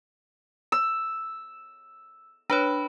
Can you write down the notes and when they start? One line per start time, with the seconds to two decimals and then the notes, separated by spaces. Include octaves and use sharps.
0.72 E6
2.50 D4 B4 C#5 B5